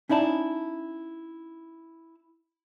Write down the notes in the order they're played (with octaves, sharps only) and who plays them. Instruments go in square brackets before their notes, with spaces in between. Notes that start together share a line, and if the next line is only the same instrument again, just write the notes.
[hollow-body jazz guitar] C#4 D#4 E4 D5 A5